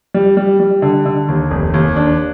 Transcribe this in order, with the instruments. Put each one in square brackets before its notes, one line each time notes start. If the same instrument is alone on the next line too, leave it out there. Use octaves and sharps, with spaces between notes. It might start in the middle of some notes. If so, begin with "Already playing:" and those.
[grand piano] G3
G3
G3
D3
D3
D#2
F1
D#2
D4